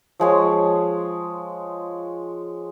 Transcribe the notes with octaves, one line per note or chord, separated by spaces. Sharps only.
F3 G#3 C#5